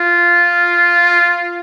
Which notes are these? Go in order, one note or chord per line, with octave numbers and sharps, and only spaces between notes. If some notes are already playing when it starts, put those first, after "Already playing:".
Already playing: F4